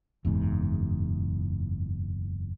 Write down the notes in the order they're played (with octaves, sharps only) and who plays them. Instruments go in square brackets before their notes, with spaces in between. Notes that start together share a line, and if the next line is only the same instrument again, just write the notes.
[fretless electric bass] F#1 E2 G#2